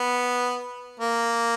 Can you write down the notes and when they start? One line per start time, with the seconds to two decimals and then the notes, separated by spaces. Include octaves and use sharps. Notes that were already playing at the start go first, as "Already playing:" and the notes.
Already playing: B3
1.00 A#3